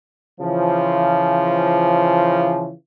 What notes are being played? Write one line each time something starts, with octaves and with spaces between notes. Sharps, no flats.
C#3 E3 F3